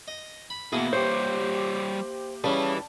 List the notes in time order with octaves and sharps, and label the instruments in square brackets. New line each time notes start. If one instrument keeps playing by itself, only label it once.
[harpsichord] D#5
B5
[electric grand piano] B2 [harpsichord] A#3 E4 [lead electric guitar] B3 G#4
[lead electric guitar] G3 C#5 [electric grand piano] G4 G6 [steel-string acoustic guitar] C5
[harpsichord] C#3 C#4 [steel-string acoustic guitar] G3 [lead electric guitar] E4 B4 [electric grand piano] A5